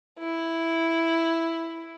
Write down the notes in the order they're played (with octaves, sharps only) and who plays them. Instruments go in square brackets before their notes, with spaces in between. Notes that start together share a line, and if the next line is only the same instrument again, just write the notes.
[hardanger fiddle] E4